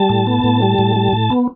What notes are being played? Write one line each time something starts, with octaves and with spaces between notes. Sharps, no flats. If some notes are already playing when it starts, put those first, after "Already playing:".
Already playing: G3 A5
A2
B3
A2
G3
A2
G3
A2
B3